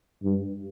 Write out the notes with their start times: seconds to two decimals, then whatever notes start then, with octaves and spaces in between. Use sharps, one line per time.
0.23 G2